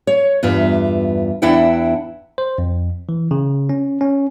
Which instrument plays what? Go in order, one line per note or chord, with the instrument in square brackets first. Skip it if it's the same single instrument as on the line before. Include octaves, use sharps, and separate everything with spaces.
[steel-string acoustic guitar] C#5
E2 G2 F4 E5
E2 D4 E4 E5 F#5 G5
[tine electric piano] C5
F2
E3
C#3
C#4
C#4